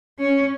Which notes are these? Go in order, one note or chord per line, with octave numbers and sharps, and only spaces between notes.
C#4